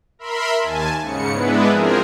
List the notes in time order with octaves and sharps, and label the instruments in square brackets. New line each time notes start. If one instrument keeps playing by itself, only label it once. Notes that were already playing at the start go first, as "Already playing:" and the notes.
[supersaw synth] A#4 E5 B5 C6
D#2 G#5 A5
G#2 C#3 C#7
G#3 B3 D4 E4 B4
F3 C4 G#4 A#4